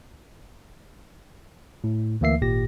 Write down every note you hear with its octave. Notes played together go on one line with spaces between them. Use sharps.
A2
D2 E3 A#3 E5 C7
G#1 A#2 G4 A#6